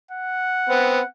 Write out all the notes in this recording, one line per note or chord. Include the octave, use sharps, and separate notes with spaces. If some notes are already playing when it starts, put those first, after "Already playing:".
F#5
B3 C4